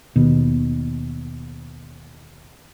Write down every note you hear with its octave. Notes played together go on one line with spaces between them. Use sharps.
D#2 B2